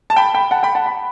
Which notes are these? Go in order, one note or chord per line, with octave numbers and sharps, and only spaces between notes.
A5
G5 B5
G5 B5
F#5 A5
G5 B5
F#5 A5
B5